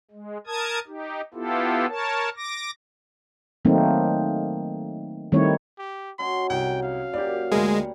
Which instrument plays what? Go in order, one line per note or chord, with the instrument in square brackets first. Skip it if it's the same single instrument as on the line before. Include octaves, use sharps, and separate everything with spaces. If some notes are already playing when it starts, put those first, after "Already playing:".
[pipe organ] G#3
A#4 A5 D#6 G#6
D#4 G4
B3 E4 F4 G4 A4
A#4 C#5 A5
D6 A#6
[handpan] D#3 F#3 A3 A#3 C4 D#4
D#3 G3 A3 C4 E4 C#5
[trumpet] G4
[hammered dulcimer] F#3 C#4 D#5 [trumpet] C6
[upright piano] C2 [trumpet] G5
[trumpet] F5
[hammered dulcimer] F#2 A#2 D6 [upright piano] G4 D5
[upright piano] D2 A#3 [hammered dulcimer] G3 A#5 B5 [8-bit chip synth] G#3